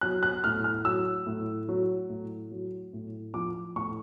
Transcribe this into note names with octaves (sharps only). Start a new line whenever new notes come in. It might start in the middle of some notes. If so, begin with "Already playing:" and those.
F#3 F#6
F#6
A2 F6
F6
F#3 E6
A2
F#3
A2
F#3
A2
F3 D6
A2 C#6